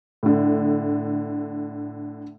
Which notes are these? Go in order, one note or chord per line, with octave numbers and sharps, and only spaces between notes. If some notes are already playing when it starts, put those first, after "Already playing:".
A2 D3